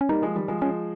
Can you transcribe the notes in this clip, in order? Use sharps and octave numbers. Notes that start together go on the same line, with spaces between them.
C#4
G3 A#3 D#4
F3 G#3
D#3 G3
F3 G#3
F3 G#3 C#4